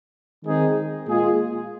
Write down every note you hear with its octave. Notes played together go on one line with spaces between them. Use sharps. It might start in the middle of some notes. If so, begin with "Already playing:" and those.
D#3 G#3 C4 D#4 G#4
A#2 G#3 F4 G#4